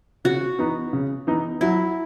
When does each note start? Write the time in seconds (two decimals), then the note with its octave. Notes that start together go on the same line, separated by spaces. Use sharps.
0.25 C#3 F#4
0.59 E3 B3 D#4
0.93 C#3
1.27 E3 B3 D#4
1.61 F#3 E4